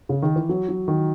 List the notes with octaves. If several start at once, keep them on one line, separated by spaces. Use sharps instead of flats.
C#3
D#3
E3
F#3
F#3
D#3